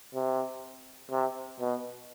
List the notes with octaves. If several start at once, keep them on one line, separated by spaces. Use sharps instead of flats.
C3
C3
B2